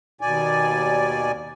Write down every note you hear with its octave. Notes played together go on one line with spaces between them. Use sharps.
D#2 B2 D5 G#5